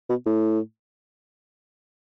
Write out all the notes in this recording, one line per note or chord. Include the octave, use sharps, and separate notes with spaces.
B2
A2